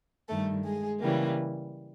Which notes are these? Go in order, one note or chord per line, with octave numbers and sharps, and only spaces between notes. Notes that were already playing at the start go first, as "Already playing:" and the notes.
G2 D#3 G3 A3 A4
G#3 G#4
C#3 E3 G3 A#3